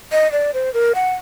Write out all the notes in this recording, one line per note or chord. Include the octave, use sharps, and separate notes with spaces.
D#5
D5
C5
A#4
F#5